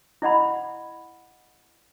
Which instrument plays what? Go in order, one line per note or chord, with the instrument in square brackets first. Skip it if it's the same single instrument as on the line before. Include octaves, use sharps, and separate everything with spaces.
[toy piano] E4 D#5 F#5 B5